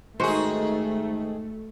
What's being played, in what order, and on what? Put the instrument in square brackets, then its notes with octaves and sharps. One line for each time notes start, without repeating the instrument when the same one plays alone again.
[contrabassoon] G#2 [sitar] D#3 G#4 [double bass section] A3 [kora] F#4 C5